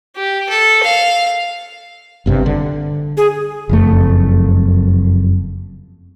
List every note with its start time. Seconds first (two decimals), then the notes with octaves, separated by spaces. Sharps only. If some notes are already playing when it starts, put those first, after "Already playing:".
0.16 G4
0.49 A4
0.83 F5
2.26 G1 G2 C3
2.46 D3
3.17 G#4
3.69 F#1 F2 A3